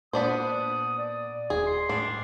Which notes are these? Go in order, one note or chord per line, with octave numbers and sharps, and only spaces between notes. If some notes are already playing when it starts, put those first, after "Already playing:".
A#2 B3 D4 C5 D#6
D5
D#1 G#4
C6
A2 G3 D4